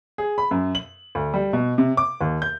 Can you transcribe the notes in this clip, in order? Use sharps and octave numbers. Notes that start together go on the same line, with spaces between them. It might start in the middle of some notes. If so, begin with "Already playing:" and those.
G#4
B5
F#2
F#7
D2
G3
B2
C3
D6
D#2
G6